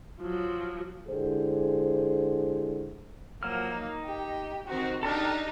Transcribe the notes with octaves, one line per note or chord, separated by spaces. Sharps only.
F3 F#3
D3 G#3 E4 G4 G#4 C5
F3 F#3 A#3 F6
D#4
G4
D#3 C4 D#4 F#4
D4 D#4 G4 A4 A5 F6